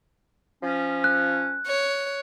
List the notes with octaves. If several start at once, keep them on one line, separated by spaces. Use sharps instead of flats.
F3 C#4
F#6
C#5